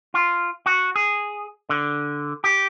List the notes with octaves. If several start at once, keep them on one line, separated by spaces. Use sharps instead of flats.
F4
F#4
G#4
D3
G4